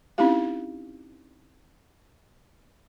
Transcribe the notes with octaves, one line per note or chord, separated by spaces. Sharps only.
C4 C#4 D#4 E4 G4 F5